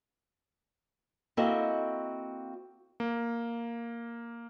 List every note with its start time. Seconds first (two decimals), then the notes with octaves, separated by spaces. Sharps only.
1.37 A#3 C4 E4 F#4 A4 D#5
3.00 A#3